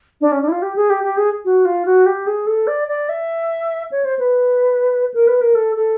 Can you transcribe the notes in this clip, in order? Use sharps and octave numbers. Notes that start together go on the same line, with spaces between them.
D4
C#4
D4
E4
F4
G4
G#4
G4
G4
G#4
F#4
F4
F#4
G4
G#4
A4
D5
D5
E5
C#5
C5
B4
A#4
B4
A#4
A4
A4